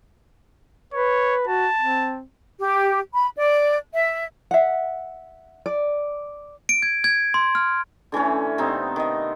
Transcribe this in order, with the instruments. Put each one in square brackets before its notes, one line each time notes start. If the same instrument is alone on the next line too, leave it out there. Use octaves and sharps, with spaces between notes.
[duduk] B4 [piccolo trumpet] C#5
[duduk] F#4 [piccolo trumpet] A5
[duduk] C4
[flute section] G4
B5
D5
E5
[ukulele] E5 F#5
D5
[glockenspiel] D7
G#6
G#6
C6
F6
[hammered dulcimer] D3 E3 A3 C#4
C3 B3 C4 D#4
D#3 D#5